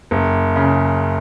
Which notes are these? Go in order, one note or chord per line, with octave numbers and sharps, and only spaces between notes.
F#1
C#3